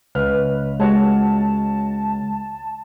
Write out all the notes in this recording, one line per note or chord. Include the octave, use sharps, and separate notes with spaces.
C#2 B4 F6
G#3 F#4 C#5 F#5 A5